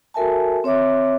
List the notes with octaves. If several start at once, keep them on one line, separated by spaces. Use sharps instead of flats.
F#4 A4 A#4 E5 G#5 A5
C4 C#5 E5 D6